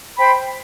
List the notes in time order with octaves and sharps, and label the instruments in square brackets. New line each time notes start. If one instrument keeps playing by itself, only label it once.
[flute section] C5 G5 B5